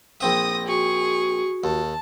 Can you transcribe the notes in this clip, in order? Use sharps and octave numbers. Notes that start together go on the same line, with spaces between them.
A#1 C4 E5 D#6 A#6
F#4 G#4 C#6
D#2 A5